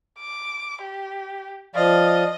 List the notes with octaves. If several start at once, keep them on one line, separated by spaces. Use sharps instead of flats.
D6
G4
F3 D5 D#5 F5